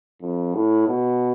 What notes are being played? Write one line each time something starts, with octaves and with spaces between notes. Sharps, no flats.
F2
A2
B2